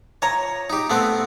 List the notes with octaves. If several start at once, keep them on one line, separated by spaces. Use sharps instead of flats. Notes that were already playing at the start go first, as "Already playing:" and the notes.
F3 C#5 A#5
D#4 G4
A3 B3 C4